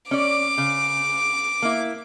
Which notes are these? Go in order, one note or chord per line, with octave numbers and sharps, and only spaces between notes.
C#4 D5 D6
C#3
A#3 E4